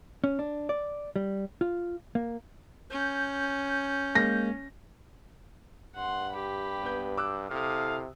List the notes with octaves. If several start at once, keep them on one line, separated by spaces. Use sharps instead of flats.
C#4
D4
D5
G3
F4
A#3
C#4 G6
G#3 A#3 A#6
G2 F#5 C6
G4 B5
B3 G6
D6 E6 F#6
C3 E4 A4 F5 D#6